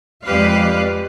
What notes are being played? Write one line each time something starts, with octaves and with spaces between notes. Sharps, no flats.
F2 G#3 G4 B4 D5 F5